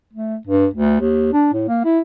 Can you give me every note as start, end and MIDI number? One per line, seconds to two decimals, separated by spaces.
0.13 0.36 57
0.47 0.66 43
0.74 1.00 38
1.00 1.32 39
1.32 1.48 62
1.53 1.67 45
1.68 1.81 58
1.84 1.99 64